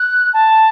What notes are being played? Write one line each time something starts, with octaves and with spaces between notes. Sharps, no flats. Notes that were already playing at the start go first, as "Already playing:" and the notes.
Already playing: F#6
A5